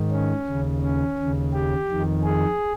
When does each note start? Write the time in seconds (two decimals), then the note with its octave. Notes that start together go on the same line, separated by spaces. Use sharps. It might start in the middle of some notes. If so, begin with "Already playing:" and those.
Already playing: G#2 D#3
0.11 C#4
0.47 D#2 C#3
0.82 C#4
1.18 D#2 C#3
1.53 G4
1.88 F2 D#3
2.23 G#4